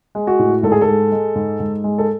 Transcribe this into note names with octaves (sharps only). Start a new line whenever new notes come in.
G#3
F#4
A2
G#2 A4
G#4
A4
G#3
G#3
G#2
G#2
G#3
A4